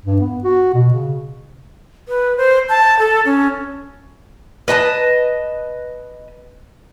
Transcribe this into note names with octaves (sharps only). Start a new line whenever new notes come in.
G2
B3
F#4
B2
C#3
B4
C5
A5
A4
C#4
B4 D#5 G5 A5